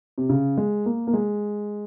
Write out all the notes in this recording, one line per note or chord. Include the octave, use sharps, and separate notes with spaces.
C3
C#3
G#3
A#3
A#3
G#3